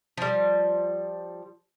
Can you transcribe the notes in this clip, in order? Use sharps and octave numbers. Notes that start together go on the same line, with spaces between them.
F3 G3